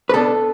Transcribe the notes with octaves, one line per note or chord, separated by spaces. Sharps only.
B4
B2 B3 D4 A4